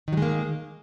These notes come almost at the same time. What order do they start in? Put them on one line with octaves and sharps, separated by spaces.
D#3 F#3 G#3 A#3